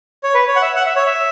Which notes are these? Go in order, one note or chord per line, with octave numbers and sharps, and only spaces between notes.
C#5
B4
C#5
F#5
E5
F#5
E5
C#5
E5